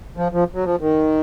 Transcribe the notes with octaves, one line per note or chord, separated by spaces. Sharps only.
F3
F3
F#3
F3
D#3